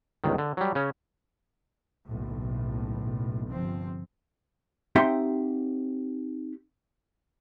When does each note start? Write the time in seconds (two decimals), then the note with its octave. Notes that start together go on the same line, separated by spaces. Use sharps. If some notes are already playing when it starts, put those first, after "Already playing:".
0.24 G1 C#2 D#3
0.38 D3
0.57 F#3 G3
0.75 C#3 C#4
2.08 F#1 B1 A2
3.52 G1 C3 F3 C4
4.96 C4 D#4 G4 E5 F#5 C6